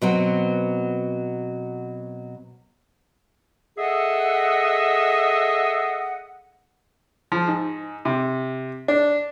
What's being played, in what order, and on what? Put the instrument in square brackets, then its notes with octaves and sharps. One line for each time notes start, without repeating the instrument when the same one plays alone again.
[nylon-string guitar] B2 F#3 C4
[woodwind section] G#4 A4 D#5 E5 F#5
[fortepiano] F3
G#2
C3
D4